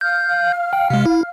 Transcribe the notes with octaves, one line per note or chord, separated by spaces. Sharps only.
F5 F6 G6
G5
C3 G#3
E4